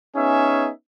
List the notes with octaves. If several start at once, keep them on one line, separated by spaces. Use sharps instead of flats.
B3 C#4 D#4 G#4 E5